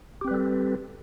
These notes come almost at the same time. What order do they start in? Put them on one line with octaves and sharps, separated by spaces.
G4 C4 B4 G3 A4